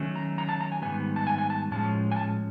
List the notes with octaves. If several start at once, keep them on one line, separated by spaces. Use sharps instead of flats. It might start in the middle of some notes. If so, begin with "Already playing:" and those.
Already playing: D#3 F#3 A3 C#4
A#5
A#5
A5
A#5
G#5
G#2 D#3 G3 B3 G#5
A5
G#5
G#5
A5
A2 F3 G#3 C#4 A5
G#5
A5